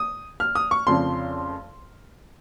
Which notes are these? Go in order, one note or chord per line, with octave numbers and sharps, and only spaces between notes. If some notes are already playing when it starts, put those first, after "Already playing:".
Already playing: D#6
F6
D#6
C#6
F1 F2 C#3 F3 C6